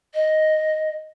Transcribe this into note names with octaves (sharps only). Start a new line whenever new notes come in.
D#5